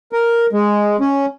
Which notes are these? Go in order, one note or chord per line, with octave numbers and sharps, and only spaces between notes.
A#4
G#3
C#4